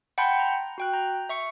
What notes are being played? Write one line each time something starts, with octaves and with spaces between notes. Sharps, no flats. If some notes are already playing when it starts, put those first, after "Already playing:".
F#5 G5 A5 B5 C6 G6
A#5
F#4 G5 F#6
A#5 G6
E5 C#6 C#7